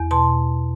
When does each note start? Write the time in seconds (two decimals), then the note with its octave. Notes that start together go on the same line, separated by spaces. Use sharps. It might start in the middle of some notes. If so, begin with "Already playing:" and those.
Already playing: E2
0.11 B2 A5 C6